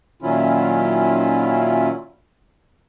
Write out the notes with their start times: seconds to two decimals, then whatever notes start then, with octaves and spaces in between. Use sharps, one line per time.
0.22 A#2 D#3 F#3 C#4 E4 F4